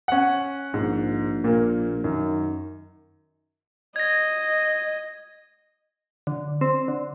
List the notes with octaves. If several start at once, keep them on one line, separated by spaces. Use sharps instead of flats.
C#4 F#5
A#1 G#2
A#2 A#3
F#2 D#3
D#5 G#6 A#6
D3
C4
D3